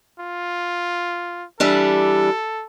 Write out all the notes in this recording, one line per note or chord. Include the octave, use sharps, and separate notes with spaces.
F4
E3 G3 D4 A4